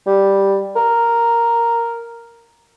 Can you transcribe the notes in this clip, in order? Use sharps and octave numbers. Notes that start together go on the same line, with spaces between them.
G3
A#4